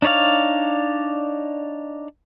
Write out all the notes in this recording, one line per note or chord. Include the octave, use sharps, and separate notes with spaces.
D4 D#4 C#5 D5 F5